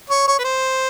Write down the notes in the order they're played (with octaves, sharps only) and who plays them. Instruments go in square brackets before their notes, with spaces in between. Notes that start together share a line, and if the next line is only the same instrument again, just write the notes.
[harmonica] C#5
C#5
B4
C5